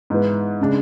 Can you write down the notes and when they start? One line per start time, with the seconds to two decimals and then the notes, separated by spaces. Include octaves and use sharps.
0.10 G#2 E3 B3
0.61 C#3 G#3 D4